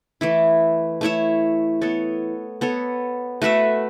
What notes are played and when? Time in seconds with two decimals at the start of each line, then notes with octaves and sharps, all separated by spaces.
0.21 E3 A3 E4
1.01 A3 E4 C#5 E5
1.82 B3 A4 C#5
2.61 B3 A4 C#5
3.42 A3 F#4 B4 E5